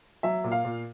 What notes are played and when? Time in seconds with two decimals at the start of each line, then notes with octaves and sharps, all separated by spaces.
0.23 F#3 E5
0.44 A#2
0.51 F5
0.65 A#2